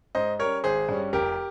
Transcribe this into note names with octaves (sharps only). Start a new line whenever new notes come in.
G#2 C5 D#5
G3 C#4 A#4 C#5
G#1 G#4 C5
G2 G3 C#4
F1 G4 A#4